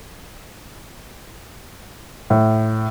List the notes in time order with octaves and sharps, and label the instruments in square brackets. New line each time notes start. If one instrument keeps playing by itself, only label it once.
[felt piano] A2